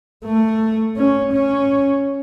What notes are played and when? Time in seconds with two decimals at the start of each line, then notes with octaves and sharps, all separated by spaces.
0.24 A3
0.96 C#4
1.32 C#4